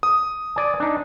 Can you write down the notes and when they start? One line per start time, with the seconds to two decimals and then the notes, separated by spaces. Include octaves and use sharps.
0.03 D#6
0.56 D5 G#5
0.80 D4 D#4